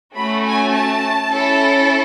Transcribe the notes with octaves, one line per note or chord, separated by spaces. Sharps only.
A3 C#4 F#4 B5
G#5
A5
C#4 E4 A4